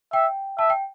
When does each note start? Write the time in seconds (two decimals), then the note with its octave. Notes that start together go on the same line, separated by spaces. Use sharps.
0.13 E5 G5
0.58 E5 A5
0.70 G5